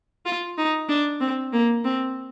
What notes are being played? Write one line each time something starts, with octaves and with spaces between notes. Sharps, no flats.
F4
D#4
D4
C4
A#3
C4